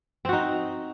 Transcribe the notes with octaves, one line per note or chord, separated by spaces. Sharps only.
C4 D#4 F#4